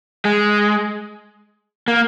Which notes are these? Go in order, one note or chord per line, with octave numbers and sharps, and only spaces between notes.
G#3
A#3